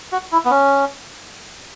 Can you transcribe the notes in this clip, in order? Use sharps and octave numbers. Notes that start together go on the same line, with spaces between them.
F#4
E4
B3
C#4